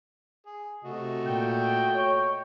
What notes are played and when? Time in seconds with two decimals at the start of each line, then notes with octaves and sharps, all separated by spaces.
0.46 G#4
0.84 C3 A3 F#4 D#5
1.26 A#2 G5
1.95 C#5